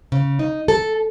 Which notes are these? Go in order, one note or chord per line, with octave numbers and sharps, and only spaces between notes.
C#3
D#4
A4